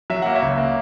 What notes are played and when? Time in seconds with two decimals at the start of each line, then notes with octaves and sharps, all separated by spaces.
0.10 F#3 E5
0.22 A#3 F#5
0.35 C#5 E5
0.42 C#2
0.58 A#3